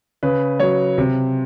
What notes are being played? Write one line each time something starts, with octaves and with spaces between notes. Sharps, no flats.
C#3 B4
F#3 C#5
C3